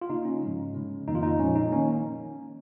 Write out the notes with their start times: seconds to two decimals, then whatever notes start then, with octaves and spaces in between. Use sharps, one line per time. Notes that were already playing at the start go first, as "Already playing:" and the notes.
0.01 F4
0.09 C#3 A#3 D#4
0.25 C#4
0.42 G#2 F3 G#3
0.75 C#3 G#3
1.08 F2 D#3 A#3 D#4
1.15 F4
1.23 D#4
1.39 A#2 F3 G#3 C#4
1.55 D#4
1.72 D#3 A#3 C#4